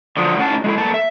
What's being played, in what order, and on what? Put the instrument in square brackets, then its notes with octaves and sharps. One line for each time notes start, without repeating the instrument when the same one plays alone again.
[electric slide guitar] D3 F3 F#3 [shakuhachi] D#6
[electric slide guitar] A2 C#4 A5 [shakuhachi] F#5
[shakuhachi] D#4
[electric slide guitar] G#3 D#4 E4 [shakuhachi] A4
[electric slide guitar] A#3 B3 A5
E5